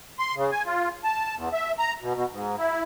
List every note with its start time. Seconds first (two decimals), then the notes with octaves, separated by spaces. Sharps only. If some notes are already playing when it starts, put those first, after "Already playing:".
0.19 C6
0.35 C#3
0.52 G#5
0.66 F4
1.04 A5
1.36 E2
1.53 E5
1.79 A#5
2.02 B2
2.15 B2
2.32 G#2
2.59 E4